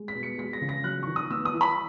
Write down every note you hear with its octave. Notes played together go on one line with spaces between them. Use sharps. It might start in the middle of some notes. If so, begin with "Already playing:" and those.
Already playing: G#3
B6
B2
C#7
G#3 B6
A#6
C#3
A#6
F#3 F#6
D#3 C#6
D#6
B3 E6
D#6
E3
B5